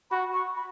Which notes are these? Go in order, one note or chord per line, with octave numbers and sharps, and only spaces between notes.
F#4 B5
C#6
B5